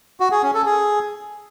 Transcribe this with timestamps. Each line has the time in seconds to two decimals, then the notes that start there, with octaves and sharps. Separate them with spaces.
0.20 F#4
0.32 G#4
0.43 C#4
0.54 A4
0.66 G#4